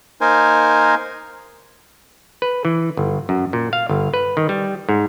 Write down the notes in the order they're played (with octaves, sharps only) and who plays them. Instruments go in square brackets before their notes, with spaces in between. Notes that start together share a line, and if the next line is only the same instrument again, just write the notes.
[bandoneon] A#3 D#4 A#4 C5 G#5
[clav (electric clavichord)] B4
E3
G1
F#2
A#2
F5
G1
B4
D#3
G3
G#2